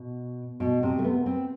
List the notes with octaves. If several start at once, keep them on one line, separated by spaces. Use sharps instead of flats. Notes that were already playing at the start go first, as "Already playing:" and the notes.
Already playing: B2
B2
C3
A3
B3
C4